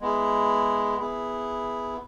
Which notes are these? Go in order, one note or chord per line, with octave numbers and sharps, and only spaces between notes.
G#3 B3 E4 G#4
B3 E4 G#4